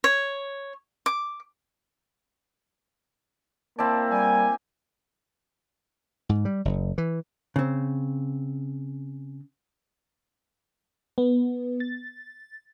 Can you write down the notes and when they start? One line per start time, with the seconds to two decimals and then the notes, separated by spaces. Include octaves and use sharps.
0.04 C#5
1.06 D6
3.79 A#3 C4 E4 D5 A5
4.11 G3 G#5
6.29 G#2
6.45 G3
6.65 F#1
6.98 E3
7.56 C#3 C4
11.18 B3
11.80 A6